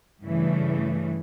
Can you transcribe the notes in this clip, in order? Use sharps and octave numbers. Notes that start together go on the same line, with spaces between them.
G2 C#3 E3 A3